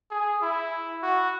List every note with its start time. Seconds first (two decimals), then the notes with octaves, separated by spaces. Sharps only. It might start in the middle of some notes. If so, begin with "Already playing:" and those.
0.11 G#4
0.42 E4
1.03 F#4